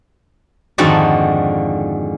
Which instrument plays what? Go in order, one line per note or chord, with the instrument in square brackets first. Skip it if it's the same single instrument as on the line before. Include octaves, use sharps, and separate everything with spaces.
[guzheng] F2 G#2 D3 D#3 F#4 A5